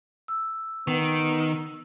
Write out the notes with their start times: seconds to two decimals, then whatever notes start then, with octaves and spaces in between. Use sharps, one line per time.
0.28 E6
0.87 D#3 B3